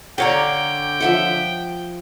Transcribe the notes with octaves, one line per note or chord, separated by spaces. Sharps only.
D3 C#5 D5 F5 G5 A#5
F3 E5 F#5